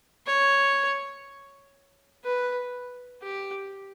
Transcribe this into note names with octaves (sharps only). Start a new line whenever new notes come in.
C#5
B4
G4